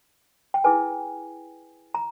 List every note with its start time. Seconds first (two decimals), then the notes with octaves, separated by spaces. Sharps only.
0.54 G5
0.64 E4 G#4 B4 G#5
1.94 A#5